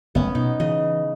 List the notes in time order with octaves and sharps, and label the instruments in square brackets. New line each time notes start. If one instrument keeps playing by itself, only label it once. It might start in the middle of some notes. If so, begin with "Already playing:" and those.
[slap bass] F#1 A3 [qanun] B3 C#4
[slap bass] B2 [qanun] D#4
[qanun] C#3 D#5 [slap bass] E3